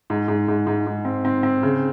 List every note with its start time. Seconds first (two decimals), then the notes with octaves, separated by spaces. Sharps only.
0.10 G#2
0.28 G#2
0.48 G#2
0.67 G#2
0.87 G#2
1.05 C4
1.25 C4
1.43 C4
1.63 C#3